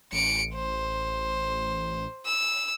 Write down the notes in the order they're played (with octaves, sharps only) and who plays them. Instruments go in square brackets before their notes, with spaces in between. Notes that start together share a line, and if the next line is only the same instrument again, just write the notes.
[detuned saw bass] A1 [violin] C#7 D7
[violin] C5
E6